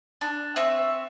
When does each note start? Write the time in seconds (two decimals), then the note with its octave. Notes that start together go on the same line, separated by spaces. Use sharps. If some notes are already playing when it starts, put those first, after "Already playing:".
0.21 D4
0.56 C4 E5 C#6